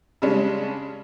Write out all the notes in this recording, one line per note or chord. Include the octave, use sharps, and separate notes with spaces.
C#3 G3 G#3 C#4 D4